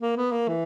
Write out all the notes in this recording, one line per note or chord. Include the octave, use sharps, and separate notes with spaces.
A#3
B3
A#3
E3